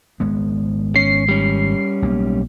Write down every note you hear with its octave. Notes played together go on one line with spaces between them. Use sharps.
G#1 G#3 B3
C#4 C7
G3 C#4
B1 A#3